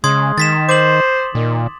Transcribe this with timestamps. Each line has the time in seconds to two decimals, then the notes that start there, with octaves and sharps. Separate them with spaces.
0.04 C#3 G#3 C6 D#6 G#6
0.38 D#3 A6 B6 E7
0.69 C5 D6 F#7
1.35 A#2 D#3